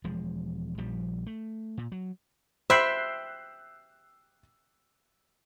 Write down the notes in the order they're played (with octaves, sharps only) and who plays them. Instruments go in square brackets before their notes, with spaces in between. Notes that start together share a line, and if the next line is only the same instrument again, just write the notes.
[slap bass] E1 F3 G#3
A#1 F3 G3
A3
A#2
F#3
[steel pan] C5 B5 [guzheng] E5 G5 [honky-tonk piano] E6 F#6 C7